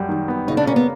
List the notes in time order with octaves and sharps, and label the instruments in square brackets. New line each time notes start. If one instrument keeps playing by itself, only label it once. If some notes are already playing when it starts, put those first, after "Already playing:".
Already playing: [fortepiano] F#2 G3
D#3
B3
[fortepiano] C#3 [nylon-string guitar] D#4
[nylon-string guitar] D4
[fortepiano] A#3 [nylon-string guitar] C#4
[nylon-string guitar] B3